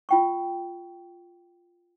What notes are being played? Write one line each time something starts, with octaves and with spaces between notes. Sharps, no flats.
F4 G5 C#6